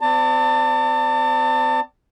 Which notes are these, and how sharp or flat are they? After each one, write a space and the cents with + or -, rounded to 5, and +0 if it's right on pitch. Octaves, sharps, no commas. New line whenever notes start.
C4 -40 D5 -10 A5 +30